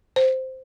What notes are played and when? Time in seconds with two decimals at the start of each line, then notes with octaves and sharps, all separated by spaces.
0.16 C5